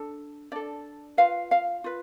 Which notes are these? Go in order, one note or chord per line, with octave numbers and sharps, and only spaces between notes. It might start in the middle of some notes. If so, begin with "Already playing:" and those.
Already playing: D4 A4
D4 A4 D5
F4 B4 F5
F5
F4 B4